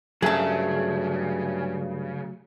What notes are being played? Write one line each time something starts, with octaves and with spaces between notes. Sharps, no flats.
G2 C#3 F#3 A3 G#4 E5 A5